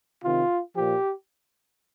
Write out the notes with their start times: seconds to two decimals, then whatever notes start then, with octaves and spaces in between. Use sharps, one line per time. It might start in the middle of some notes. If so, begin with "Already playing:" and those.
0.24 C3 D#3 F4
0.76 A#2 F3 G4